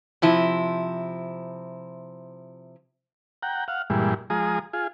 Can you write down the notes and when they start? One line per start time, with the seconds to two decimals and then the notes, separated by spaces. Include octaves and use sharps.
0.22 C3 F3 E4
3.43 F#5 G5 A#5
3.68 F5 F#5
3.90 G2 A#2 E3 G3 G#3
4.30 F3 G#3 G#4 A#5 D#6
4.73 F4 G#4